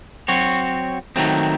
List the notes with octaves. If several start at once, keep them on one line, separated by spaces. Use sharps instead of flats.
F#3 C4 F#4 C#5
D#3 F#3 A3 C4